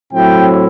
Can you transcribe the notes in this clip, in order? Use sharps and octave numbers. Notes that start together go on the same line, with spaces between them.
A2 F#3 C4 E4 G5